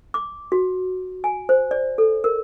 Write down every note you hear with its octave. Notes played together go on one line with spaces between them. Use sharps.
D6
F#4
G#5
C5
D5
A4
A#4